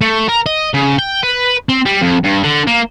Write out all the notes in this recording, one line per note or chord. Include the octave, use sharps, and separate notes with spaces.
A3
A#4
D#5
C#3
G5
B4
C4
G3
F2
G2
D3
A#3